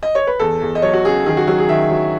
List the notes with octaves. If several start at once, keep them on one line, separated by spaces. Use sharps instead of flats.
D#5
C#5
B4
E2 A4
E2
D#5
F#3 C#5
F#4
C#3 G#4
D#3 G#4
F#4
F#3 F#4
G#4
D#3 E5
F#3